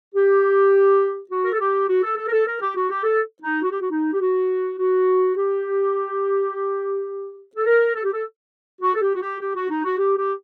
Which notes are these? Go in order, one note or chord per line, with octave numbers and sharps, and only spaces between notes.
G4
F#4
A#4
A4
G4
F#4
A4
A4
A#4
A4
A#4
G4
F#4
G4
A4
D#4
F#4
G4
F#4
D#4
G4
F#4
F#4
G4
A4
A#4
A4
G4
A4
F#4
A4
G4
F#4
G4
G4
F#4
D#4
F#4
G4
G4